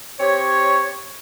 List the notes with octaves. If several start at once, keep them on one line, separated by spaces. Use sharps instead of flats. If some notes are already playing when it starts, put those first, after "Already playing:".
C4 G4 C#5